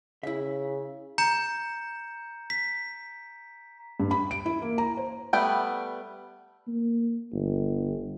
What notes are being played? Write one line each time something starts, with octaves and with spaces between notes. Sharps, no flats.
C#3 E4 E5
A#5 G6 C#7 E7
B6
G2
B5
D7
E4
A#3
A#5
C5
G3 A3 B3 G5
A#3
G1